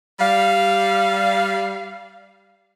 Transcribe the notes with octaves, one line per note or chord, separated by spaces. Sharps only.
G3 F5